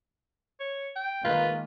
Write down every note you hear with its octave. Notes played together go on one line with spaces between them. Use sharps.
C#5
G5
D#3 G#3 A#3 F4 B4